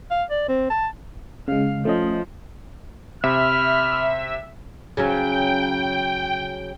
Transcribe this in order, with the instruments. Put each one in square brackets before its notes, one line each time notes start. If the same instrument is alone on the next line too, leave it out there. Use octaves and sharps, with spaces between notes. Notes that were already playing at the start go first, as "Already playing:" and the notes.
[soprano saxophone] F5
D5
C4
A5
[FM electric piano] C#3 G#3 [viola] F5
[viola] F3 [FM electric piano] A3 C#4 D#5
[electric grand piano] C3 [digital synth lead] E5 [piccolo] B5 [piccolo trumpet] F6
[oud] C#3 F#3 C#4 [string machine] G5